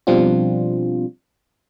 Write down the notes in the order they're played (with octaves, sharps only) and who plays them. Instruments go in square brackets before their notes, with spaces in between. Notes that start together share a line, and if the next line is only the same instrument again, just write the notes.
[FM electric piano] B2 F3 G3 C4 D4 F4